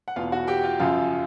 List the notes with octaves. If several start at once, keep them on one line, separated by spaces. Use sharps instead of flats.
F#5
E2 B2 F4 F5
F#4 F#5
G4 G5
F4 F5
F#2 C#3 F3 F4 F5